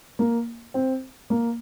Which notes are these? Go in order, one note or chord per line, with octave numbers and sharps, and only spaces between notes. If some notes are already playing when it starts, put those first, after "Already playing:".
A#3
C4
A#3